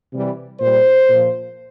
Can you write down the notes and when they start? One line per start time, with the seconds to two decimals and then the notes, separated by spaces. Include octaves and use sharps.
0.13 C3 E3 G3
0.60 A#2 G3 C5
1.10 A#2 F3